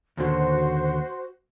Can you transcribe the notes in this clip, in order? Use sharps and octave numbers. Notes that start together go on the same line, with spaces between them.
D#2 A#2 D3 F#4 C5